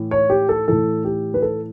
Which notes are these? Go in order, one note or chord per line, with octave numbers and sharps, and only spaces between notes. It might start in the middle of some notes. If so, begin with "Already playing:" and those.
Already playing: A2 E3
C#5
G4
A4
A2 E3 A4
G4
B4
A4